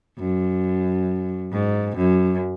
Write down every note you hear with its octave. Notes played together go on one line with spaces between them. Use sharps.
F#2
G#2
F#2